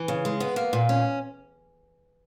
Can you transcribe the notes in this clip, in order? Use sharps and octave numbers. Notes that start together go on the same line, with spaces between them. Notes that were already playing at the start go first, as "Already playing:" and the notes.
Already playing: E3
C#3
G#3
B3
A#3
A#2
C#4